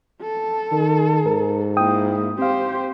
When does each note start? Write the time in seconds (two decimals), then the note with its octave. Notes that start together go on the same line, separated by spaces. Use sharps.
0.21 A4
0.72 D#3
1.26 G#2 A#4
1.77 A#3 E4 G5 D#6
2.39 C4 G4 C5 F5